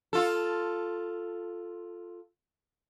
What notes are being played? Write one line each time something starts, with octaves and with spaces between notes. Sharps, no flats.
F4 A4